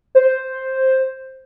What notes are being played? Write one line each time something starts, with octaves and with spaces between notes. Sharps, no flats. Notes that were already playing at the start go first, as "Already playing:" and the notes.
C5